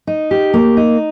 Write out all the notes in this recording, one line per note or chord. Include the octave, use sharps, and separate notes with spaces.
D#4
G4
A#3
D#4